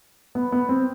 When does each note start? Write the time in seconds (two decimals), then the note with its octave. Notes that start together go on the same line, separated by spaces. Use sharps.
0.35 B3
0.52 B3
0.69 C4